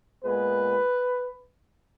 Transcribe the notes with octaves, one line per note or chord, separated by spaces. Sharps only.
A#2 G#3 B3 B4